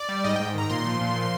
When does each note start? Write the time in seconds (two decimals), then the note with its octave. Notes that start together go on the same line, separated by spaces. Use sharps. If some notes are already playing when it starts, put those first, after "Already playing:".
Already playing: D5
0.09 G3
0.24 G#2 D#5
0.36 G#2 G5
0.55 D#3 A#5
0.70 A#2 C6
0.85 F3
1.01 A#2
1.15 F3